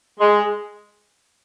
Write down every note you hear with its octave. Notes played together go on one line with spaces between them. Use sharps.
G#3